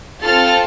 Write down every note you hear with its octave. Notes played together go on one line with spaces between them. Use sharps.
C4 F4 A4 F6 A6